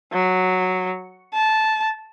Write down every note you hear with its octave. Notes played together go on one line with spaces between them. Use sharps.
F#3
A5